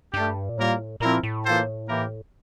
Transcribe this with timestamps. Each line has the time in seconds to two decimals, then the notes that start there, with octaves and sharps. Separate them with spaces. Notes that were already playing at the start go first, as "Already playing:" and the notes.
0.13 G2 A3 D4 G4
0.49 A#2
0.57 A2 G3 A#3 F4 A#4
1.00 A#2 F3 C4 E4 A#4
1.23 A2
1.45 E3 A#3 F4 A4 C5
1.88 E3 A#3 E4 G4 A#4